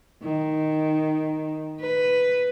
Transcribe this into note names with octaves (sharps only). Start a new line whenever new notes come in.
D#3
B4